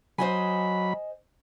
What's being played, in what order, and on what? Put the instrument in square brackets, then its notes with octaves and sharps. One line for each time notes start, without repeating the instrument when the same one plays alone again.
[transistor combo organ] F#3 B5 [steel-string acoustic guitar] C5 D#5 G#5